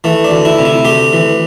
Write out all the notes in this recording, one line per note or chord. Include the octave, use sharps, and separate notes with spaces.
E3 A3
D4
D2
E4
C3
E4
D2 G4
E3